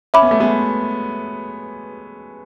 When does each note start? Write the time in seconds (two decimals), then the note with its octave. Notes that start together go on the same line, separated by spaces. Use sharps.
0.14 C#4 E5 B5 D6
0.22 B3
0.31 A3
0.40 G#3 B3